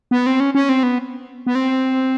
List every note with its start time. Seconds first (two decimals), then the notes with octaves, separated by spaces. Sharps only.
0.11 B3
0.26 C4
0.40 C#4
0.55 C#4
0.69 C4
0.83 B3
1.46 B3
1.55 C4